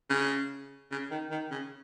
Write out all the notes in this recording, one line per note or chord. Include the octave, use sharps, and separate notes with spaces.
C#3
C#3
D#3
D#3
C#3